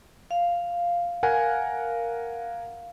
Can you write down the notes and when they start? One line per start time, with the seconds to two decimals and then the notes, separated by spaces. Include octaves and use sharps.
0.31 F5
1.23 A#4 F#5 G#5